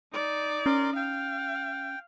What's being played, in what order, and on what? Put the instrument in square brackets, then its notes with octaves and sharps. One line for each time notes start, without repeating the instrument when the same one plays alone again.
[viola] D#4 D5
[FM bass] C#4 [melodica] A#4 C6
[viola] F5 [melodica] G5